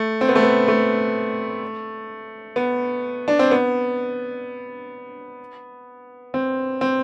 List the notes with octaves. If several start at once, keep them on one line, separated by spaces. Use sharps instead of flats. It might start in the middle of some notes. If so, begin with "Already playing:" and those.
Already playing: A3
C4
B3
A3
B3
A3
B3
D4
C4
B3
C4
C4